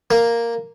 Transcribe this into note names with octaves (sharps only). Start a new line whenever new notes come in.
A#3